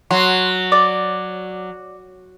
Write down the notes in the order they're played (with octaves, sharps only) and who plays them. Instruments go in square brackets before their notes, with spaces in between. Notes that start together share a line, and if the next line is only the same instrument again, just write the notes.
[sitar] F#3 [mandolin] C6
[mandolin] D5